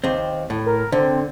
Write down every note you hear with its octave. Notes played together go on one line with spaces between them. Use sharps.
D#2 C4
A2
A#4
D3 C4